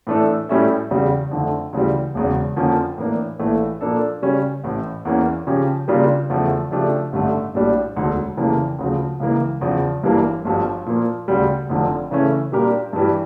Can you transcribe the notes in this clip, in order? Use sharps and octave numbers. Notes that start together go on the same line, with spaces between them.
A2 E3 A3 D4 A4
A2 G3 C#4 E4 A4
E2 C#3 G3
F2 D3 A3
D2 C#3 E3 G3
E1 E2 C#3
F2 D3 F3 A#3 C#4
A2 E3 A#3 D4
A#1 A2 E3 A3
A#2 F3 A#3 D4 A4
C#3 G3 C#4
A1 A2 E3
E2 E3 A#3 C#4
C#3 F3 C#4 G4
C#3 G3 A#3 D4 F4
E2 C#3 F3 A3
C#3 F3 A3 D4 G4
A1 G2 D3 A3
A#1 A2 G3 D4
E1 D2 D3
F1 F2 C#3 E3 A#3
D2 C#3 F3
C#2 C#3 E3 A#3
E2 C#3 F3
G1 G2 E3 G3 A#3
G1 G2 F3
A#2 F3 A#3
D2 C#3 G3
F1 F2 D3 F3
C#3 E3 A3 C#4
A#2 G3 D4 G4 A#4
G2 E3 G3